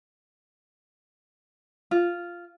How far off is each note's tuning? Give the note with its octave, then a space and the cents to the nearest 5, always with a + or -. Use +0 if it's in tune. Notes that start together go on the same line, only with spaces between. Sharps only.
F4 -5